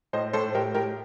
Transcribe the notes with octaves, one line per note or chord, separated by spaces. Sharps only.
A2 C5 D#5
A2 A4 C5
A2 G4 A#4
A2 G4 A#4